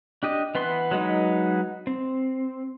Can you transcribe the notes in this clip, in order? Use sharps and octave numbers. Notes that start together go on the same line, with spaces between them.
D4 G4 D#5
E3 B3 B4 C6
F#3 G#3 B3 D#4
C4